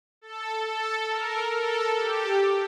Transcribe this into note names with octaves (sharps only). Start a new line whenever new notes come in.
A4
A4
A#4
A4
G4